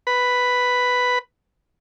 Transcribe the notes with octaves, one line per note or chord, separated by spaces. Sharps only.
B4 B5